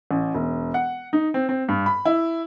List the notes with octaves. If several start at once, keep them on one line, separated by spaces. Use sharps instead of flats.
A1
E1
F#5
D#4
C4
C4
G2
B5
E4